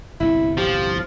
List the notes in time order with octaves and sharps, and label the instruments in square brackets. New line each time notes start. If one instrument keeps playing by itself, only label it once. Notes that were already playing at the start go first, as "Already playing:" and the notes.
[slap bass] G1 C2 A2 [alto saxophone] E4
[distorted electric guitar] F3 [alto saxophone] G4